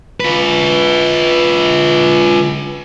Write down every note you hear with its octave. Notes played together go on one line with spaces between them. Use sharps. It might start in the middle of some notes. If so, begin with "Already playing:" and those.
F4 B4